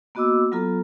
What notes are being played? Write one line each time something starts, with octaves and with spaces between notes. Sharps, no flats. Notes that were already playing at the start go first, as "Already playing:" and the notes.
A#3 B3 F#4 D#5 D6 E6
F#3 B3 F4 A4 A#5